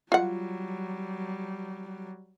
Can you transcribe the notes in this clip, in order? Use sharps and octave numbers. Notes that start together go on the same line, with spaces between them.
F#3 G3 F4 F#5